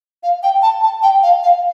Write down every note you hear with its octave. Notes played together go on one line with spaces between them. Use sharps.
F5
G5
A5
A5
G5
F5
F5